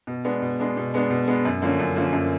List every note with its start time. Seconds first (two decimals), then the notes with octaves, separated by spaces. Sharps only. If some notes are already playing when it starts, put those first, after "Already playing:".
0.07 B2
0.24 G#3 B3 D4
0.42 B2
0.60 G#3 B3 D4
0.77 B2
0.94 G#3 B3 D4
1.10 B2
1.27 G#3 B3 D4
1.45 F#2
1.62 D3 F3 A#3 C#4
1.79 F#2
1.95 D3 F3 A#3 C#4
2.13 F#2